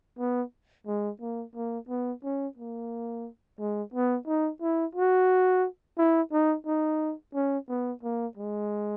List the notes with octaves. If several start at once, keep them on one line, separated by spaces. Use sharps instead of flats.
B3
G#3
A#3
A#3
B3
C#4
A#3
G#3
B3
D#4
E4
F#4
E4
D#4
D#4
C#4
B3
A#3
G#3